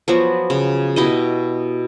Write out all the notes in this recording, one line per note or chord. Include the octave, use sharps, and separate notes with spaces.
F3 F#3 B3 F#4
C#3
B2 E4 G4 D#5